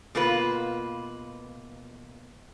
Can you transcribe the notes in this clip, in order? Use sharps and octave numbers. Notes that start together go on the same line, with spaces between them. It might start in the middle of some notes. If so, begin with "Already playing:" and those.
B2 A#3 F4 B4